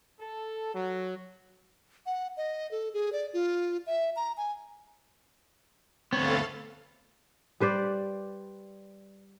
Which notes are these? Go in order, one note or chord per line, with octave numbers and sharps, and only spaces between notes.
A4
F#3
F#5
D#5
A4
G#4
D5
F4
E5
A#5
G#5
D2 B3 C4 A4 C#5 F5 A5
G3 B4 C5 D5